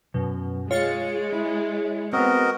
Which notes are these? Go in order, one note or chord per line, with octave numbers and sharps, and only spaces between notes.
F#2 B2
G#3 F4 C#5 A6 C#7
E4
B3 C4 F#4 A#4 D#5